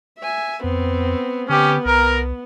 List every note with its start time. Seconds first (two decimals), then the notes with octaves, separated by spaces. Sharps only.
0.19 E5 G#5
0.64 F2 B3 C4
1.49 D3 B3 C#4 G4
1.85 C2 A#4